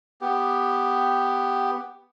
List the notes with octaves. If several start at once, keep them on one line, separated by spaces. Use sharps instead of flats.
B3 G4